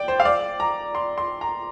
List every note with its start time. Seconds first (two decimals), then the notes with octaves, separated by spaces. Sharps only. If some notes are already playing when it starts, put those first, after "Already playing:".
Already playing: D5 G5
0.08 C5
0.20 F5
0.25 D5
0.60 A#5
0.95 C6
1.18 C6
1.41 A#5